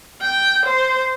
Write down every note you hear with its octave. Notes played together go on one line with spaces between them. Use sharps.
G5
C5